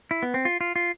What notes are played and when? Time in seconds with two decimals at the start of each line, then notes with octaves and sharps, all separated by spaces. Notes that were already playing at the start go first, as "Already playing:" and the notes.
0.11 E4
0.23 B3
0.34 C4
0.45 F4
0.61 F4
0.76 F4